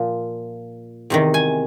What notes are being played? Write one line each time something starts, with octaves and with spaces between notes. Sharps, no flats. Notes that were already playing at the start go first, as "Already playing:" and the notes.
Already playing: A#2 F3
E2 C3 D#3
G#5